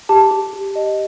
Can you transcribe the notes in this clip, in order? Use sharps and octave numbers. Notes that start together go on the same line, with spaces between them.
G4 A5
G4
G4
D#5